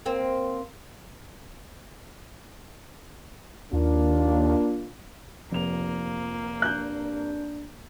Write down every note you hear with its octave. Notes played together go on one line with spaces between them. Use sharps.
A#3 C4
D#2 A#3 D4 F4
F1 F3 A#3 F7
D4 F#6 G6